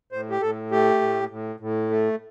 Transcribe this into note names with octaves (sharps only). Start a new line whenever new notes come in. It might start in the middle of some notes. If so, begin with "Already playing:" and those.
A2 C5
G4
A2 A4
A3 G4
A2
A2
A2
A3